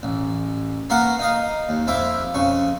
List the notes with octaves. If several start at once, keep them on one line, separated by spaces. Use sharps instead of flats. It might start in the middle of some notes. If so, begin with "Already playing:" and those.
A1
A#3 B3 F#4 A#4 F5 F#5
D#4 D#5 F5
D#2
F2 F3 E4 E5 D6
F2 C#3 C#6